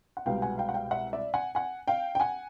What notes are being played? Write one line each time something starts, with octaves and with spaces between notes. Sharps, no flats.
F#5
C2 B2 G#3 B3 F5 G5
F#5 G#5
F5 G5
F#5
F5 G5
E5 F#5
D5 E5
F#5 G#5
F#5 G#5
F5 G5
G5
F#5 G#5